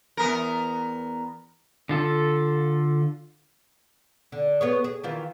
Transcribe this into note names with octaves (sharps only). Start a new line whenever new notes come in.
E2 B3 A#4
D3 F4 A4
D3
B3 G#4 C#5
G#4
D#3 E3 F4